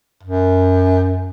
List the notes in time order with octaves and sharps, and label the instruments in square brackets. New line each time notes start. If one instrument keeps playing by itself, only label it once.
[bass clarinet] F#2